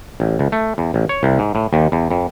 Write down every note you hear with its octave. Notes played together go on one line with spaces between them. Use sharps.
A1
C#2
A3
E2
A1
C#5
C2
G#2
A2
D#2
E2
F2